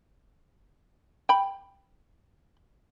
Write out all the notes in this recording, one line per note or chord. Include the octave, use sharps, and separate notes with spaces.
G5 B5